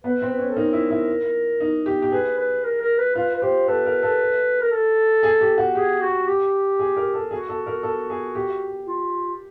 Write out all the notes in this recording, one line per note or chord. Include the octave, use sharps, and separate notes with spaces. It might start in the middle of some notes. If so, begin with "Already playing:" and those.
B3 B4
C4
B4
C#4
A4
D#4 A#4
E4
E4
D#4
G4
G4
G#4 B4
B4
A#4
A#4
B4
F4 B4
B4
G4 C5
A4 B4
A#4
A4
A#4
A4
G#4
G4
F#4
G4 G#4
F#4
G4
G#4
A#4
A4
F#4 G#4
A4
A#4
A4
G#4
G4
F4